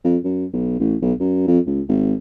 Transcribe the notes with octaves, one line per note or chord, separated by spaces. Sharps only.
F2
F#2
B1
A1
B1
F#2
F2
C#2
G#1